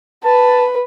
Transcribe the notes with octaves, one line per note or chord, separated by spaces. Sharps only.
B4 A5